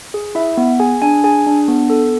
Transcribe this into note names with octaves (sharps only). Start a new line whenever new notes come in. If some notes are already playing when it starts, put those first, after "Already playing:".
G#4
E4 E5
B3
G#4 G#5
D4 G#5
G#4 G#5
D4
B3
A4